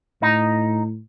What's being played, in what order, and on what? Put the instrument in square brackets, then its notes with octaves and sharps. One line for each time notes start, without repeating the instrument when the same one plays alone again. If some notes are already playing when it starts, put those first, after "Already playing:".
[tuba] A2 [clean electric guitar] D#4